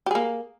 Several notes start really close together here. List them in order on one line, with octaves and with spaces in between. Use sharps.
G4 G#4 A#3